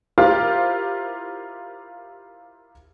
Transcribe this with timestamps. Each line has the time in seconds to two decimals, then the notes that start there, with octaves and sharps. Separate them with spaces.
0.18 E4 F4 G4 A#4 C5 F5